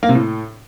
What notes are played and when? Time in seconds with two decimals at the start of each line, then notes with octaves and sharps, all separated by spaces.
0.03 A#3
0.09 C3
0.15 A2